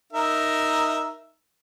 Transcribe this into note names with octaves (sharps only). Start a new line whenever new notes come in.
D#4 A#4 E5